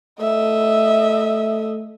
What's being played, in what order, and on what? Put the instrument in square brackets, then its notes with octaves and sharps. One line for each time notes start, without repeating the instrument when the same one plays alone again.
[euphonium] A3 [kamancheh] D#5 E5